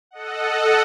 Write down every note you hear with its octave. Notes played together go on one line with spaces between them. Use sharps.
A4 D#5 F#5